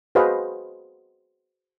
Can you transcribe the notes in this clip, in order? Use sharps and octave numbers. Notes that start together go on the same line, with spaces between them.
F#4 G#4 B4 C5 D#5 F5